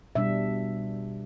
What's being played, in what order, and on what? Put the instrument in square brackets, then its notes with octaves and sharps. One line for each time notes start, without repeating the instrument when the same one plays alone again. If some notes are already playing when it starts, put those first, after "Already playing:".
[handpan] B2 G3 D4 E5